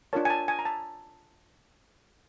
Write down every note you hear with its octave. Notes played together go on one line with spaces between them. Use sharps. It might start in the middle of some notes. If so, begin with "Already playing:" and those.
D4 F4 A#4 C#5 A5
G#5
A5
G#5
A#5
A5